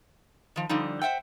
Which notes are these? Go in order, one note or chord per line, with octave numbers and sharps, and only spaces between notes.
D#3 F3
D3 F3 G3 D#4
C5 E5 F#5 G5